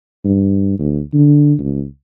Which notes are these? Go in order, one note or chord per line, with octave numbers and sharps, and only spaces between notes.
G2
D2
D3
C#2